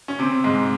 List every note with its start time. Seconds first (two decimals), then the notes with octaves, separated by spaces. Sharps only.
0.08 C#4
0.19 C3 C4
0.44 G#2 G#3